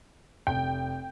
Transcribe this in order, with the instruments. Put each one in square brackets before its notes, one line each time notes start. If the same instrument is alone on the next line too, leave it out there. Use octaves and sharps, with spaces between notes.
[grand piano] F1 [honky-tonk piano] G5